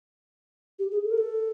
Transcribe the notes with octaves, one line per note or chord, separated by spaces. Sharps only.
G4
G#4
A4
A#4
A4